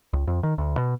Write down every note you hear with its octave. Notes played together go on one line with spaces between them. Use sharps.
C#2
F2
D#3
D2
B2